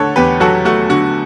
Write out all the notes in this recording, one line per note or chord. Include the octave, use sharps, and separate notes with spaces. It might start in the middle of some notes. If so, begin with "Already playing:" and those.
Already playing: D3 A3 A4 C#5 F#5
E2 G4 B4
F#3 F#4 A4
A3 F#4
D3 F#4